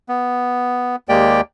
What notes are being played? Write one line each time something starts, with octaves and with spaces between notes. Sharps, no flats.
B3
D#2 G#3 A#3 G4 D5 G5